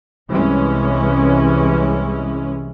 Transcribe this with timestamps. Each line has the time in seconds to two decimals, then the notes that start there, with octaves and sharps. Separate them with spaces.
0.29 C2 E3 G#3 C#4